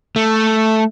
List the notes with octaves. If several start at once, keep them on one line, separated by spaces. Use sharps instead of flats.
A3